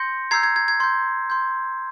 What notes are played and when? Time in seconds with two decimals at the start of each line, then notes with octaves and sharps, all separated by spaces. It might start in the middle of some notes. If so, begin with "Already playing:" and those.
Already playing: C6 G6 A#6 C#7
0.31 A#5 E6 G6 G#6 C7
0.43 G#6
0.56 G#6
0.68 G#6
0.80 C6 G6 G#6
1.30 C6 G6